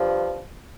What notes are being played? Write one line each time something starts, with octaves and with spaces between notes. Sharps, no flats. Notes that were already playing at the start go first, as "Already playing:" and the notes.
Already playing: G2 F3